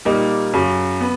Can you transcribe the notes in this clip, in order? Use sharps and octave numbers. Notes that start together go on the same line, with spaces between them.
A#2 G3 A#3 D#4
F#2 C#3 F#3
B3